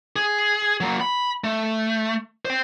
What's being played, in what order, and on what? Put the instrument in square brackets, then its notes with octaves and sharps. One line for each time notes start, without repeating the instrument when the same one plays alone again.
[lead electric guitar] G#4
F#3 A#3
B5
A3
C5 G5